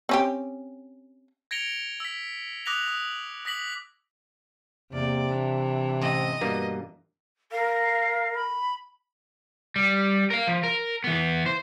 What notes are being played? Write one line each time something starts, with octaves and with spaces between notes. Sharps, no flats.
C4 C#4 G4
G#6 A#6 C#7 D7 F7 G7
E6 B6
D6 D#6 F#6 A#6 B6 F7
D#6
D#6 A#6 B6 F#7
E2 C3 A#3 D5
E3 D4
A1 C4 D#5
G2 B2 A#3
A#4 F5
B5
G3
A#4 F5
F3
A#4
E3 B3
C5